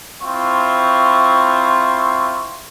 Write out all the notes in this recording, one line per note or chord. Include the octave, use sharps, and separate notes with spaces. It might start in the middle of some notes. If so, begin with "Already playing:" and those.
C4 E4 F4 C6 C#6